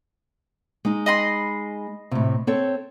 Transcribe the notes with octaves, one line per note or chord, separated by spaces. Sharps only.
G#3 D#4
D#5 B5 C6
A2 C3
C4 A4 C#5